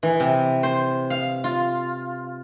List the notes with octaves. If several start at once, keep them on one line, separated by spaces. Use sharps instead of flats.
E3
C3
C5
F5
F4